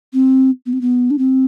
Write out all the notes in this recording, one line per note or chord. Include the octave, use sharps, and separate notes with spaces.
C4
B3
C4
B3
D4
C4